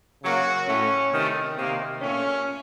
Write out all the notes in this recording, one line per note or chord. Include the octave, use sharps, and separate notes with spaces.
C#3 F#3 A#3 F#4
A2 A3 C#4
C3 D#3 A3
C3 D#3 A#3
A#2 A3 C#4